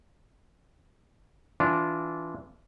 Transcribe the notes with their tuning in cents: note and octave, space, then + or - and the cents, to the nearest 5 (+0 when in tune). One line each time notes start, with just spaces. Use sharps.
E3 +0 D4 -20 F4 +0